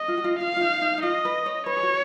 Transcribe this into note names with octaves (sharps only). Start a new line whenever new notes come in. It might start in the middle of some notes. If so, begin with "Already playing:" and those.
Already playing: D#5
F4
F#4
F4
F4 F5
F4
D#4
D#4
D#4
F4 D#5
B4
C#5
B4 C#5
G#4
F#4